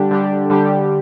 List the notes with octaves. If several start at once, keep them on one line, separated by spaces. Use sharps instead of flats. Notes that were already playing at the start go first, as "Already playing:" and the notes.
Already playing: D3 G3 D4 G4
D3 G3 D4 G4
D3 G3 D4 G4